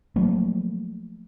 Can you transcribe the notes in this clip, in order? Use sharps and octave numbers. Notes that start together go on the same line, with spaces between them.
F3 F#3 A3 A#3